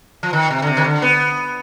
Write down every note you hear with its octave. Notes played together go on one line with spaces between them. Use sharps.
F3
D#3
C3
D3
C3
D#3
D3
B3